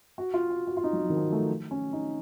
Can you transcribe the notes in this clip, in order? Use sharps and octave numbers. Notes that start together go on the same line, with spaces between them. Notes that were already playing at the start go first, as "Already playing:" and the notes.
F#4
F4
F#4
F#4
F4
D#4
F#3
F3
D#3
F3
A3
C#4
D#4